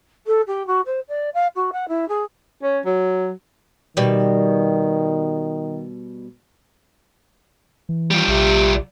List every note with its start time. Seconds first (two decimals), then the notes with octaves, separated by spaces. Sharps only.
0.26 A4
0.47 G4
0.67 F#4
0.85 C5
1.08 D5
1.34 F5
1.55 F#4
1.72 F#5
1.88 E4
2.08 G#4
2.63 C#4
2.86 F#3
3.97 B2 D#3 G3
7.89 E3
8.11 G3 F4
8.28 A#1 C3